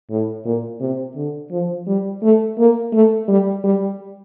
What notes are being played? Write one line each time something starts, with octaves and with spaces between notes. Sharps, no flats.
A2
A#2
C3
D3
F3
G3
A3
A#3
A3
G3
G3